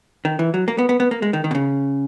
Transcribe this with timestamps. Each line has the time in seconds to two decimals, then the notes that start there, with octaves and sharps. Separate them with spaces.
0.25 D#3
0.39 E3
0.54 F#3
0.68 A#3
0.78 B3
0.89 B3
1.00 B3
1.11 A#3
1.22 G#3
1.33 D#3
1.44 D#3
1.51 B2
1.55 C#3